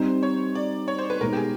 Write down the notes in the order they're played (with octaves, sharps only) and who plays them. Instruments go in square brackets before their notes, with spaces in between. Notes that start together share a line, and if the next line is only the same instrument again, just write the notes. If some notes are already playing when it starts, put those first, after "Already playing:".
Already playing: [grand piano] G3 C4 D#4 [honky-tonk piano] C5
[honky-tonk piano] C#5
D5
C#5
C5
B4
[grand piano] B2 G#3 B3 D#4 [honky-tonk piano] A#4
[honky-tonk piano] G4
G#4